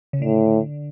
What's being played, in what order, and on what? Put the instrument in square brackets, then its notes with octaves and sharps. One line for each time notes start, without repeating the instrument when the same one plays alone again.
[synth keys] C#3
[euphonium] A2 [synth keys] D3